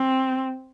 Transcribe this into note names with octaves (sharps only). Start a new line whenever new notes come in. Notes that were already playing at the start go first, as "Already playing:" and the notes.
Already playing: C4